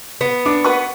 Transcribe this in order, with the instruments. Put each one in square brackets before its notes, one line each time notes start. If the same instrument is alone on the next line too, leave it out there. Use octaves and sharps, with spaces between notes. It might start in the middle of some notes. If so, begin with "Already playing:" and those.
[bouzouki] B3
[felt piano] D4 D6
B4 F#5 C#6